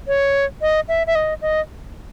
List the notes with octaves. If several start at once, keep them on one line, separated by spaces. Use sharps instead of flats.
C#5
D#5
E5
E5
D#5
D#5